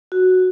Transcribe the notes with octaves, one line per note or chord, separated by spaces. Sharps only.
F#4